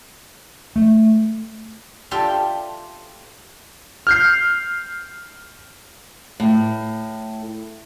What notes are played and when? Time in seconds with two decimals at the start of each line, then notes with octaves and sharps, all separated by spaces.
0.76 A3
2.11 F4 G4 A4 D5 E5
4.07 F6 G6 C7
6.40 A2